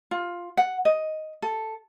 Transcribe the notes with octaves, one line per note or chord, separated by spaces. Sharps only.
F4
F#5
D#5
A4